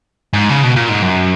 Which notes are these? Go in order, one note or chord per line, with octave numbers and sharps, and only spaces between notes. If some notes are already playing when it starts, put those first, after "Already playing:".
G#2
C#3
B2
A#2
G#2
F#2